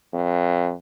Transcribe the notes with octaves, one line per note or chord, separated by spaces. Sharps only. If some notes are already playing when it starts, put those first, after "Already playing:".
F2